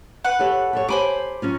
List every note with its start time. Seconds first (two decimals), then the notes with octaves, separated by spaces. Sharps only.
0.25 B4 F#5
0.39 G4 A4 C#5
0.73 G4 A4 C#5
0.89 G4 C5 G#5 B5 D6
1.42 F#3 C#4 F4